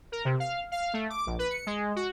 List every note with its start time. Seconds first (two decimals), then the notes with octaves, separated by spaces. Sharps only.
0.12 A#4
0.25 C3
0.40 F5
0.72 F5
0.94 A3
1.10 D6
1.26 A#1
1.39 B4
1.51 C#7
1.66 G#3
1.96 F#4